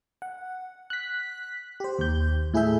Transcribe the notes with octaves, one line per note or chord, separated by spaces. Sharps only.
F#5
F#6 B6
G4 C5
D#2 G6
A2 E4 G#4 A4 E5 G6